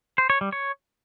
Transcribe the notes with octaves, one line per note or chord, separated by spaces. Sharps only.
C5
C#5
G3
C#5